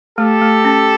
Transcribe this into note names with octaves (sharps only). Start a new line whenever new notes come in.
A3 G4 A4
A3
C#4